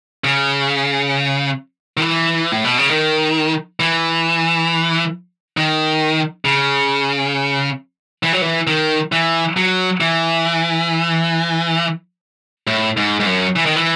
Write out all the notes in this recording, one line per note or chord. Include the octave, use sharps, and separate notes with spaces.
C#3
D#3
E3
A2
B2
C#3
D#3
E3
D#3
C#3
E3
F#3
E3
D#3
E3
F#3
E3
A2
G#2
G#2
F#2
E3
D#3
E3